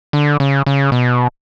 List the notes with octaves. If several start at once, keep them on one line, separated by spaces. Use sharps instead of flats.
D3
C#3
C#3
B2